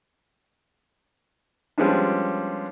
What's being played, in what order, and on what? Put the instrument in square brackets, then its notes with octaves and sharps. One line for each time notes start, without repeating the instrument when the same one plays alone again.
[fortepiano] F3 G3 G#3 B3 C#4 D4